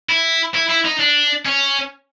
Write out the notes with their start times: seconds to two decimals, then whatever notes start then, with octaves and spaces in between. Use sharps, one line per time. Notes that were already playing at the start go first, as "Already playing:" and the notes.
0.10 E4
0.55 E4
0.70 E4
0.85 D#4
1.00 D4
1.46 C#4